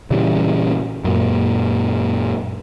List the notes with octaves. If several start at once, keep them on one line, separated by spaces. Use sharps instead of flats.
A#2 C#3 E3 G3
F#2 A#2